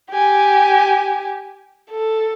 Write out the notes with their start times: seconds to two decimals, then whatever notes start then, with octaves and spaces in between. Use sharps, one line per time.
0.12 G4 G#5
1.91 A4